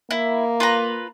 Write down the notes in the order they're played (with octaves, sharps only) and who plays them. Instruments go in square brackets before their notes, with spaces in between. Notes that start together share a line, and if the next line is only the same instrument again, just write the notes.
[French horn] A#3 [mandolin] E4
[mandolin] F4 B4 A#5